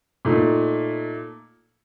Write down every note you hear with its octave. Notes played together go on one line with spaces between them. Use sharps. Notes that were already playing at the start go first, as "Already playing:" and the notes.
A#2 A3 D#4